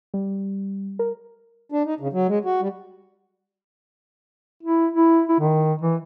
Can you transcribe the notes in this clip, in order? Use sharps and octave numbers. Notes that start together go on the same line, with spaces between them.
G3
A#4
D4
D#4
C#3
F#3
G#3
F#4
G3
E4
E4
E4
D#3
E3